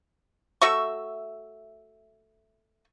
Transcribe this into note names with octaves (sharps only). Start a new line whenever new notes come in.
A3 F#4 E5 C#6